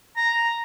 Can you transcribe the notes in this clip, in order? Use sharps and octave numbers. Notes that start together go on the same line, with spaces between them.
A#5